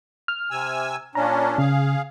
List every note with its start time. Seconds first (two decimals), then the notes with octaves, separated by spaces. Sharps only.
0.28 F6
0.51 C3 G#5 E6
1.15 A#2 C#4 D4 A#5
1.58 C#3 G#4 F5